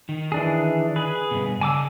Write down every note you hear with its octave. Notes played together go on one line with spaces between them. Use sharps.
D#3
E3 D4 G#4
G#4 B4
G2 B2
C#3 G#5 A5 D6 E6